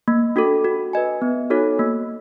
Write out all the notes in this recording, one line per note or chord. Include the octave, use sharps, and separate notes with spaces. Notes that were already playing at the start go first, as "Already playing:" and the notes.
A#3
D4 F#4 A4
F#4
B4 D#5 G#5
B3
D#4 F#4 A4 C#5
A#3